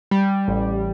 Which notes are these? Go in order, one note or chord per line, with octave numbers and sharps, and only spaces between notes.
G3
A1